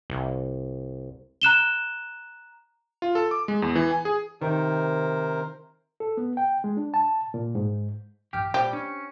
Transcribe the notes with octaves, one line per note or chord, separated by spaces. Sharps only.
C2
A#5 F#6 E7 G7
F4
A4
D6
G#3
E2
E3
G#5
G#4
C3 D#3 A#4 C5
A4
B3
G5
G#3
D4
A5
A#2
G#2
A#1 G2 E3 G4 G5 F6 G6
A#2 G3 G4 C5
C#4 D4